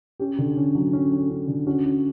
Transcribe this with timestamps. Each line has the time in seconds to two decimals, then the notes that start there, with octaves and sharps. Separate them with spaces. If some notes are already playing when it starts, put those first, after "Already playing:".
0.19 C#4 G4
0.38 D3
0.57 C#4
0.75 F#3
0.93 C#4
1.12 C#4
1.30 C#4
1.48 D3
1.67 C#4 F#4
1.85 C#4